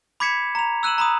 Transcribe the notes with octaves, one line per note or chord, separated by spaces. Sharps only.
B5 D6 G#6 B6 C#7 E7
A#5 F7
E6 F#6 D#7 E7 F#7
A#5 B5 D#6